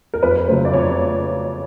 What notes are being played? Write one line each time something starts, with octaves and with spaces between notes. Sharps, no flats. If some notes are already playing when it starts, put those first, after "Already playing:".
A#4
F2 B4
C#3 F#3 A3 C5
D5
F2 C#5